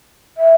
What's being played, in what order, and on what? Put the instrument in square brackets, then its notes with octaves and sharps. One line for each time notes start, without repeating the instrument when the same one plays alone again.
[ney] E5